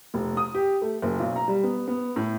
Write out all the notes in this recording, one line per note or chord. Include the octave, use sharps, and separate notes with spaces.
F1
D#6
G4
A3
F#1
B1
A#5
G3
B3
B3
A2